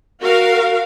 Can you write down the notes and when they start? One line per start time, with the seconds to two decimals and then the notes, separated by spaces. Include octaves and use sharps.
0.21 F#4 A#4 F5